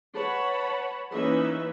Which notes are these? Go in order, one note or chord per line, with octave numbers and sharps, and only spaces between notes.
B4 C#5 F#5 A5 B5
E3 A#3 C#4 D#4 B4 E5